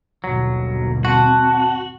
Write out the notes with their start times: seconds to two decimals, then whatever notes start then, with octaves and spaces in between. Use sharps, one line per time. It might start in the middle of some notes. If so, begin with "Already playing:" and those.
0.24 G1 D#2 B2 F#3
1.05 C4 F#4 A5